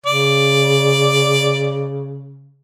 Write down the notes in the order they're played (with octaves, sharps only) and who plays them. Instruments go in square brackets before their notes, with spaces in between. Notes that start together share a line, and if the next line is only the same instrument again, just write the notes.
[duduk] C#3 [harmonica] D5